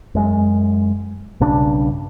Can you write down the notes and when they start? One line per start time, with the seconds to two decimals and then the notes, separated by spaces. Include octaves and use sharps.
0.15 F#2 G#3
1.40 B1 G2 C#3 D4